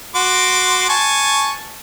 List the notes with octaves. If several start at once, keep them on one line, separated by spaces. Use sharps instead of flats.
F#4 C6 D6
G#5 A5 C#6